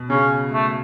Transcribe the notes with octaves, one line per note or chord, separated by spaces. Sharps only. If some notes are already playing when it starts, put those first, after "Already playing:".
Already playing: B2
C#3 C#4
A3